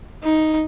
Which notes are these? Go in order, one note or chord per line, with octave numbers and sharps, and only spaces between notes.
D#4